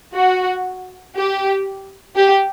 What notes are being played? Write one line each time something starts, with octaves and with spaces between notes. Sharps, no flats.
F#4
G4
G4